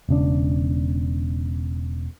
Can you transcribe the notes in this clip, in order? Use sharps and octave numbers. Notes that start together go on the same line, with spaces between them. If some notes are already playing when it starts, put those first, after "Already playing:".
E1 C#3 D4